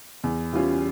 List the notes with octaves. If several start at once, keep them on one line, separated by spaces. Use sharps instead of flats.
E2
E3 G3 C#4 F4